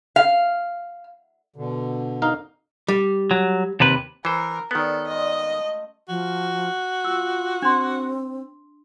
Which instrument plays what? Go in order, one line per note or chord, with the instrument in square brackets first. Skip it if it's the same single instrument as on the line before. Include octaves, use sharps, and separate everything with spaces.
[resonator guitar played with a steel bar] F5
[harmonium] B2 D3
[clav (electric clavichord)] D#4 A#4 F5
[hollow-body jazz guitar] G3
[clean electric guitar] F#3
D#2 C3 B4
[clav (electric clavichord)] E3 C5 [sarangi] A#4
[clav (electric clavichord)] D#3 B3 [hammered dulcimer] C#4 A#4 D5 [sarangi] A4
[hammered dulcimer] G#2 G3 F4 [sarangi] D#5
[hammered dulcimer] A3
[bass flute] F3 [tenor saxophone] F#4
[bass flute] F4 [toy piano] E6
[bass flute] C4 [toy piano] D4 C6